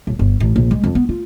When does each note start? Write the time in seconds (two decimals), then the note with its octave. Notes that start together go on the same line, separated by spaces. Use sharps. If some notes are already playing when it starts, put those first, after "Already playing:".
0.07 D#1
0.19 G1
0.40 A1
0.56 A#1
0.71 G#3
0.83 F2
0.95 B3
1.09 F4